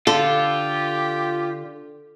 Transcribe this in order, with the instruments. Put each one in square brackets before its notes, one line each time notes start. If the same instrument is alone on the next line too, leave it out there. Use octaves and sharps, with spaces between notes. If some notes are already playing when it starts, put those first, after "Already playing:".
[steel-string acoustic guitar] D3 [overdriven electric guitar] F4 [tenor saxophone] G4 [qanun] A4